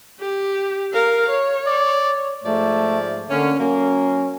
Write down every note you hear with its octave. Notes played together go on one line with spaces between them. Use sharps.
G4
A#4 F5
C#5
D5
G#2 F3 A3 D5
D3 A#3 C#4
F#3 A#3 C#4